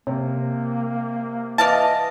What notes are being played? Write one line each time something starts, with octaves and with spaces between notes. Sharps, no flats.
C3 A#3
E3 D5 D#5 F5 A5